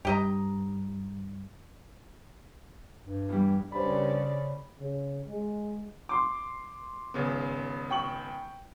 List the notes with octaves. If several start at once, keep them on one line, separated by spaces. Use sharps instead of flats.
G2 G4 D#5 A#5
G2
E2 G3
G2 C#3 C5 D5 B5
C#3
G#3
C6 D6
G#1 C#3 B3
G5 C#6 F#7